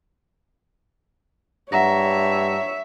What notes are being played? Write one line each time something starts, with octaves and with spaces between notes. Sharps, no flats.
G2 C#5 E5 F#5 A#5 A#6